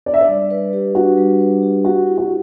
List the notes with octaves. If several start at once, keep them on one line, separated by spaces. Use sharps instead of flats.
D4 D5
E5
D5
G3
B4
G4
D4 F#4
G3
B4
G4
F#4 G4
E4
F#4